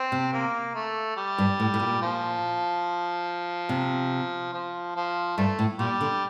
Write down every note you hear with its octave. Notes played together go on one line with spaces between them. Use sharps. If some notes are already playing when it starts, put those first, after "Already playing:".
Already playing: C4
C3
A#3
A3
G3
G2
A2
A2
A#2
F3
C3
F3
F3
G2 A3
A2
A#2 G3
D3